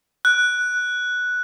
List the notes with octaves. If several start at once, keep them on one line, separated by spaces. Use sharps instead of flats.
F#6